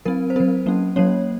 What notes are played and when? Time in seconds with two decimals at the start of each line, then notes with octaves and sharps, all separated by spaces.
0.05 F#3 C4 A#4
0.30 C5
0.36 F#3 C4 A#4
0.66 F#3 A#3 C#4
0.96 F#3 A#3 C#4 C#5